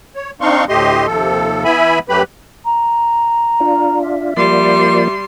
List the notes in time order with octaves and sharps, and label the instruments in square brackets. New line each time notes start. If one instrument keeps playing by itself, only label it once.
[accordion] C#5
C4 D4 D#4 F5 C6 C#6
D2 A2 A3 G4 D#5 C6
D#2 C3 F3 A4
E3 B3 E4 E5 G#5 B5
F#2 F#3 A3 G4 B4 B5
[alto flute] A#5
[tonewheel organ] D4 F4
[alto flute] E5
[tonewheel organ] F3 A#3 D5 [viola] G3 C6